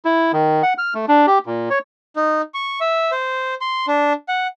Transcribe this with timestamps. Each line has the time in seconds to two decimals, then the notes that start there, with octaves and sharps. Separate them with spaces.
0.05 E4
0.32 D#3
0.63 F#5
0.78 F6
0.94 A3
1.08 D4
1.27 G4
1.46 A#2
1.70 C#5
2.16 D#4
2.54 C#6
2.81 E5
3.12 C5
3.61 C6
3.88 D4
4.29 F#5